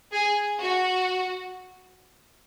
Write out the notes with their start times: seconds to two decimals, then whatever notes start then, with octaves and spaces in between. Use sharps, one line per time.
0.12 G#4
0.62 F#4